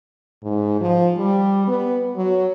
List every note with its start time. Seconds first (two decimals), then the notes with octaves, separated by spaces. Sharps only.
0.43 G#2
0.81 F3
1.17 G3
1.67 B3
2.16 F#3